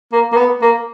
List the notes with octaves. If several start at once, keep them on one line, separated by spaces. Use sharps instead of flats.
A#3
A#3
B3
A#3